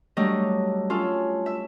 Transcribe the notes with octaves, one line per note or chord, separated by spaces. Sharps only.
F#3 G3 A3 D4 D#5
C#4 F4 A4
E5